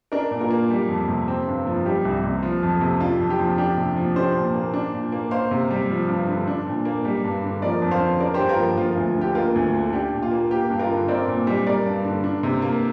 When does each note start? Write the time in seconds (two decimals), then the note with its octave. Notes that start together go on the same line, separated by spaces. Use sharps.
0.12 D4 A#4 D5
0.31 A#2
0.40 F4 A#4
0.51 A#3
0.70 G3
0.89 F2
1.08 C3
1.28 C4
1.47 G2
1.67 F3
1.85 G3 G4
2.05 C2
2.24 C3
2.43 F3
2.63 F2
2.81 C3
3.01 D4 F4
3.20 F2
3.30 G4
3.39 F3
3.58 D4 G4
3.77 C3
3.96 F3
4.16 D4 G4 C5
4.35 A#2
4.54 A#3
4.74 D4
4.94 A#2
5.12 A#3
5.31 A#3 C5 F5
5.51 C3
5.70 G3
5.90 F3
6.08 G2
6.28 D3
6.47 D4
6.67 A#2
6.85 A#3
7.05 G3
7.24 G2
7.43 D3
7.62 F3 A#4 D5
7.82 F2
7.91 C5 F5
8.00 D3
8.20 D4 A#4 D5
8.34 G2 G4 C5
8.49 F4 A#4
8.59 F3
8.78 F3 F4 A#4
8.92 D2 F4
9.17 D3 G4
9.35 A#3 F4 A#4
9.55 D2
9.75 D3
9.93 D4 G4
10.12 A#2
10.23 F4
10.31 A#3
10.51 A#3 G4
10.70 G2
10.79 F4 A#4
10.90 D3
11.08 C4 A#4 D5
11.27 A#2
11.47 G3
11.66 G3 A#4 D5
11.86 G2
12.05 D3
12.24 D4
12.43 C3
12.62 A#3